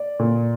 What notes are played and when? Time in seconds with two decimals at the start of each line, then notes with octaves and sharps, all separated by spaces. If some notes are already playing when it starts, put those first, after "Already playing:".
Already playing: D5
0.19 A#2